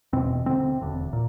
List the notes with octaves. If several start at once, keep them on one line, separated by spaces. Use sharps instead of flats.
E1 E2 B2 C4
D2 D3 C4
E1 D2 D3
A#2